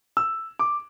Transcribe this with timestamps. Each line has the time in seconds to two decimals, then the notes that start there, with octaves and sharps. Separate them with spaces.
0.17 E6
0.59 D6